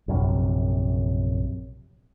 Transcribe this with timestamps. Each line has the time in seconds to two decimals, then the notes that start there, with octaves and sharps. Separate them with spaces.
0.08 A#1 F#2 C3